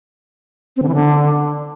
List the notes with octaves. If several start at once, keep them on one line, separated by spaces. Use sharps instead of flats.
C4
D3
E3
D3